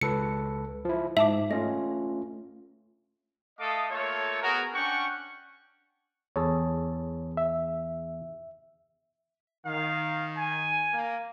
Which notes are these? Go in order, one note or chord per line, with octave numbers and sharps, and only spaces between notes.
C#2 A4 B4 C#7
F3 E4
G#2 E5 A5 D6
A3 C#4 F4 D#5
A3 A4 D#5 F5 D6 D#6
A3 A#3 F4 A4 C#5
B3 F#4 G#4 A#4
C#4 D4 F#5 G5 C#6
E2 G#4 A4 C#5
E5
D#3 F5
G#5
A#3